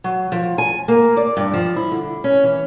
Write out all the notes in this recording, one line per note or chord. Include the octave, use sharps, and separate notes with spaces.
F#3
F3
G#5
A#3
D5
G2
F3
E4
D3
C#4
E3